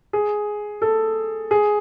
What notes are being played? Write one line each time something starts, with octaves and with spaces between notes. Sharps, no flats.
G#4
A4
G#4